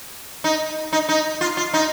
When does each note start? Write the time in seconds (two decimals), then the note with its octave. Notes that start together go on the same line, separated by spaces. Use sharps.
0.44 D#4
0.93 D#4
1.09 D#4
1.41 F4
1.57 F4
1.73 D#4